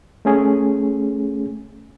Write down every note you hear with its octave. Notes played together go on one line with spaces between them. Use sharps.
A3 C#4 G#4